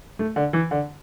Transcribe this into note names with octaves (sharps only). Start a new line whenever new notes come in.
A3
D3
E3
D3